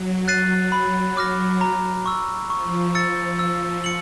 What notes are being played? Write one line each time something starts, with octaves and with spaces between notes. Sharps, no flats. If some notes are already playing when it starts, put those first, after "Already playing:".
Already playing: F#3
F#6 A6 C7 D#7
B5
D6 F6 A#6
A#5
C#6 E6
F3 C#6
E6 A6 C#7
E6
C#7 F#7